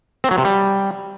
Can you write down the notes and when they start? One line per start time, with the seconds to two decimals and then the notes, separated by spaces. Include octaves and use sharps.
0.24 C4
0.31 F#3
0.38 C3
0.45 G3